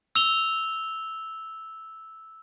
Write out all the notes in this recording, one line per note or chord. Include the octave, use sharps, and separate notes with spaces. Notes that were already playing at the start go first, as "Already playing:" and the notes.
E6 F7 G7